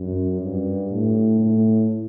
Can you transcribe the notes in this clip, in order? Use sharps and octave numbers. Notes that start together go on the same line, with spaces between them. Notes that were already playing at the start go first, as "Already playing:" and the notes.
Already playing: F#2
G2
A2
A2